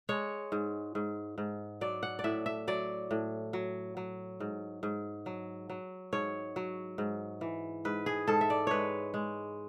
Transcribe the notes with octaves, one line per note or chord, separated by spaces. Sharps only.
G#3 C#5
G#2
G#2
G#2
F#3 D5
F#5
D5
A2 E5
E5
F#3 D5
A2
F#3
F#3
G#2
G#2
F#3
F#3
G#2 C#5
F#3
G#2
E3
G#2 B4
G#4
G#2 A4
E5
D5
G#3 B4 C#5
G#3